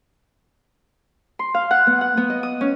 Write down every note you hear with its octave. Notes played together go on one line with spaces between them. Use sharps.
C6
F5
F#5
B3
F#5
B3
D#5
D#6
C#4